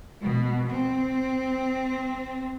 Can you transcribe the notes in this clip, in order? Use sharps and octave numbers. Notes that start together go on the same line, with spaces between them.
B2
C4